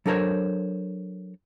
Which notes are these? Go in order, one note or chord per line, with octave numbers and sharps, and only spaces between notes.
F#3 D4 A4 A#4 C5 C#5